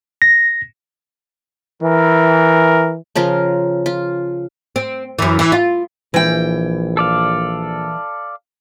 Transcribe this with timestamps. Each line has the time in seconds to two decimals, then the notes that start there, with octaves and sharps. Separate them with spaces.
0.22 A#6
1.82 E3 A#4
3.15 C#3 F3 F4 A#4
3.86 F4
4.76 C4
5.19 F#2 E3
5.39 E3
5.52 F4
6.14 A#1 E3 G5
6.97 A4 D5 F5